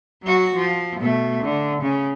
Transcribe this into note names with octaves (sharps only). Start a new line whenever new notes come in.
F#3 F#4
F3
B2 A3
D3
C#3